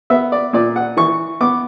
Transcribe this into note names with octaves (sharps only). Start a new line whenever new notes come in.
B3 E5
D5
A#2 D5
F#5
E3 C#6
B3 D6